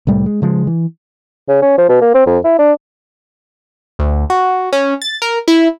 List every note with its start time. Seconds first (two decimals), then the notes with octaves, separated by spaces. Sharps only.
0.07 C2 A2 G3 A3
0.26 G#3
0.42 C#3 F3 G#3
0.67 E3
1.49 C#3
1.62 C#4
1.78 F3
1.89 B2
2.01 A#3
2.14 C4
2.26 F2
2.44 E4
2.59 D4
3.99 D2
4.30 F#4
4.73 C#4
5.02 A6
5.22 A#4
5.48 E4